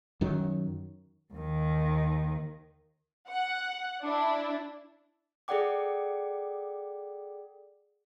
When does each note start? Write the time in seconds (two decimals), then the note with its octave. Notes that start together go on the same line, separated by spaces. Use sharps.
0.21 F#2 D#3 F#3
1.34 D#2 D#3
3.28 F#5
4.02 D4 E4
5.48 G#4 A4 D5 F#5 G5 D6